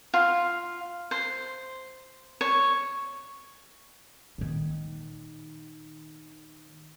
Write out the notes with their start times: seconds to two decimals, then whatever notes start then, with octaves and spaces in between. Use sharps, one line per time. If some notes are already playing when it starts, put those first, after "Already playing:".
0.14 F4
1.11 C5
2.41 C#5
4.38 A#2 D#3